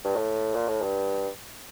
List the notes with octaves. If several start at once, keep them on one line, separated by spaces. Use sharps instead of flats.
G2
A2
A#2
A2
G2